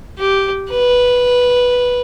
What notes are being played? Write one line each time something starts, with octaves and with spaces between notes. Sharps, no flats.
G4
B4